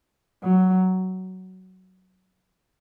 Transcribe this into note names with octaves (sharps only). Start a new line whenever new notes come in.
F#3